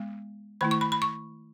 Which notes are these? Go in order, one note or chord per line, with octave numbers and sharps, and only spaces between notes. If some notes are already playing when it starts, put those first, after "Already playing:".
Already playing: G#3 B3
D#3 A3 E4 B5
C#6
B5
B5
C#6